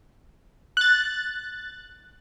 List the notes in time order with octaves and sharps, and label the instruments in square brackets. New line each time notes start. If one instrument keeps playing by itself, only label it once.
[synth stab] F#6 A6